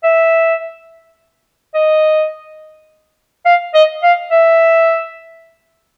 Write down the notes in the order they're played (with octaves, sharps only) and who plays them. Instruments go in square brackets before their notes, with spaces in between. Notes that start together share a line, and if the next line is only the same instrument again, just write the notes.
[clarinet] E5
D#5
F5
D#5
F5
E5